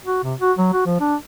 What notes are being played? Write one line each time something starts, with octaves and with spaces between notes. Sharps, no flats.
F#4
C3
F#4
F#3
F#4
F3
D4